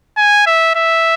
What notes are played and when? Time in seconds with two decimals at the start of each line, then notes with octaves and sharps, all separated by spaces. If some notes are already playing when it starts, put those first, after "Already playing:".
0.17 G#5
0.46 E5
0.75 E5